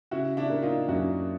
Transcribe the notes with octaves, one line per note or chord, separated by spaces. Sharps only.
C#3 E4 F#4
D4 E4
A#3
D#4 F4
F#2 E4 F#4